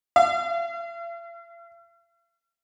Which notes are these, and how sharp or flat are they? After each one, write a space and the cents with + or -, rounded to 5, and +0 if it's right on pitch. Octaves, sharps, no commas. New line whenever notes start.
F5 -45